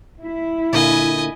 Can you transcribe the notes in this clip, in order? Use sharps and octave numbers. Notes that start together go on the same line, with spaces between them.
E4
A#2 D3 A#3 D#5 G#5